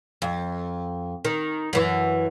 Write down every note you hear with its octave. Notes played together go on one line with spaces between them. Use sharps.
F2
D#3
F#2 E3